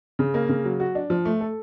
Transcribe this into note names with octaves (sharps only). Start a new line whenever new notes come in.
C#3
A#3
C#3
F#3
F#4
D4
F3
A3
A4